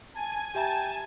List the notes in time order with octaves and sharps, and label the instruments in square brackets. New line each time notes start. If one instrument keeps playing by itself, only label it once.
[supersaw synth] G#5 [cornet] A5
[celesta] G4 E5 A#5 [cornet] G5 [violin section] A5